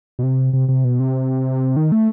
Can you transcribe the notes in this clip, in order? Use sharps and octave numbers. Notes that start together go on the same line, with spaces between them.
B2
C3
C3
C3
B2
C3
D#3
A3